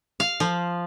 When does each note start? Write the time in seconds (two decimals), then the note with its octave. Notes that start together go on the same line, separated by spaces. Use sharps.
0.20 F5
0.40 F3